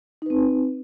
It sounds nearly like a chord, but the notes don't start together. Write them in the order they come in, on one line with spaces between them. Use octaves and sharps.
D#4 B4 C4